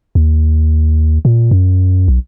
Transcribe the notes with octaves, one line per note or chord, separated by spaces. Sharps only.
D#2
A#2
F#2
B1